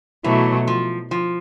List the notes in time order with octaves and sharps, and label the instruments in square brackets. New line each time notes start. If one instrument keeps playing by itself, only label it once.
[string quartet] B2 F#3 A3 [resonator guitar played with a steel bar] E3
[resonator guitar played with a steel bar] F3
F3